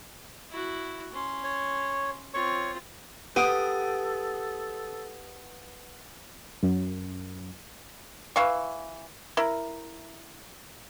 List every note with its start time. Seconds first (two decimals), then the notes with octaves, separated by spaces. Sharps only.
0.50 E4 F#4
1.13 C#4 C6
1.44 C#5
2.34 C4 F4 C#5 C#6
3.36 B3 G4 A4 D#6 D7 D#7
6.63 F#2
8.36 E3 F5 C#6
9.37 E4 A#4